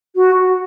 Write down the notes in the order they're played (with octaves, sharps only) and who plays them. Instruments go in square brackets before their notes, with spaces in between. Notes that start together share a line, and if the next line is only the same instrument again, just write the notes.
[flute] F#4